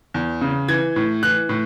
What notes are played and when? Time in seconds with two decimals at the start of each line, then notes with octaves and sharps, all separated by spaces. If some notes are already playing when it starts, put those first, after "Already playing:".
0.14 E2
0.41 C#3
0.68 E3 G#6
0.96 A2
1.23 E3 F#6
1.49 A2